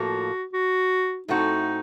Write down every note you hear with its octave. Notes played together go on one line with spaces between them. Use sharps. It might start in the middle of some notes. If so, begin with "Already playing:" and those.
Already playing: A2 F3 A#3 F4 F#4 A4
F#4
A2 A3 C4 D#4 F#4